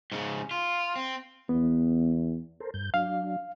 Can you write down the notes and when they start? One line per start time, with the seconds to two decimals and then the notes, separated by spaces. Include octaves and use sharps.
0.12 G#2 C#3
0.51 F4
0.96 C4
1.49 E2 B3
2.60 A4 A#4 C5
2.74 G2 G6
2.94 F#3 D4 F5